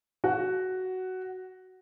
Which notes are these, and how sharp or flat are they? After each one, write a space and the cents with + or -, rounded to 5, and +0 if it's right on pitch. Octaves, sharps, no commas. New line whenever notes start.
F#4 +10